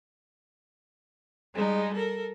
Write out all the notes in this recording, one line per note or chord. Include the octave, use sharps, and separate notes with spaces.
G3 G#3 D#4
A4 A#4